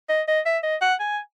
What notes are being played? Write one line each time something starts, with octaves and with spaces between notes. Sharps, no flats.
D#5
D#5
E5
D#5
F#5
G#5